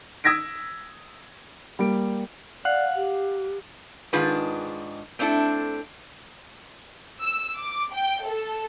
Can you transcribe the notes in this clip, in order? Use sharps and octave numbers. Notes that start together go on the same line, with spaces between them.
D#6 E6 G#6 A#6 B6 D7
G3 A#3 D7
D5 F5 F#5
G4
G#2 D#3 D4 F4 G#4 B4
A3 C4 D4 E4 A4
E6
D6
G5
A4